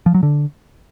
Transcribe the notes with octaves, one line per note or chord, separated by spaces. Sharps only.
F3
F#3
D3